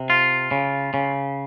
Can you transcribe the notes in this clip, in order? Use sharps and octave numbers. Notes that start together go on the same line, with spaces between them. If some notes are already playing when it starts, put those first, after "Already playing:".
Already playing: C3
F4
C#3
C#3